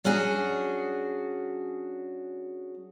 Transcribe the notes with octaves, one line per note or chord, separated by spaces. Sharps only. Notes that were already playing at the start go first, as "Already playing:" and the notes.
F#3 C#4 D4 F#4 G#4